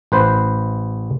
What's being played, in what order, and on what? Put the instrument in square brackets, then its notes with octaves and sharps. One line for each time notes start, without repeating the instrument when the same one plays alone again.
[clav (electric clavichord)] A1 B4 C5